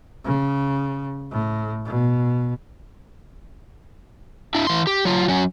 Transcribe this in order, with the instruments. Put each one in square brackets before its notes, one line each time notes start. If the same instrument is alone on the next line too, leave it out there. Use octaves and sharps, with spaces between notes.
[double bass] C#3
A2
B2
[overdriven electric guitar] D4 E4
E3 C6
G4
F#3 F4
F#3 C#4